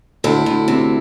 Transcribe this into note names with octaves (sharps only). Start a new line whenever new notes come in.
D2 E4
D2
C3